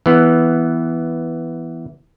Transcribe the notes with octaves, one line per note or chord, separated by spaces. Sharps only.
E3 B3